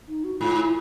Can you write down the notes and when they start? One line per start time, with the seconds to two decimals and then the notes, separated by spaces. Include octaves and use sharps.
0.08 D#4
0.24 F#4
0.40 G#2 F4
0.56 E4